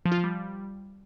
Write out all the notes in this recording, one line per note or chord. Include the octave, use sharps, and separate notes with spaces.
F3
F4
F3
G3